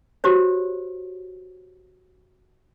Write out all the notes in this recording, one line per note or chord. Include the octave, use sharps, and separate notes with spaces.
F#4 G4 C5 C#5